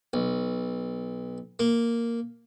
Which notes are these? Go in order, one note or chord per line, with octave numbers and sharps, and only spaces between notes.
B1
A#3